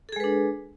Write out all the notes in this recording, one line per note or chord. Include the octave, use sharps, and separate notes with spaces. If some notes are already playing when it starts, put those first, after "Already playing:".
G#3 D4 G#4 A4 B4